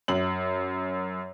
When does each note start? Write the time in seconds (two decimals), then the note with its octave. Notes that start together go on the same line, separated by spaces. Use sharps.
0.08 F#2 F#7